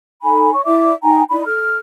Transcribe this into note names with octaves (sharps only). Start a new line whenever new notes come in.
D#4 A4 G#5 B5
C#5 C#6
E4 D5 E5 D6
D#4 G5 G#5 A#5
D#4 E4 D5 B5
A4 F6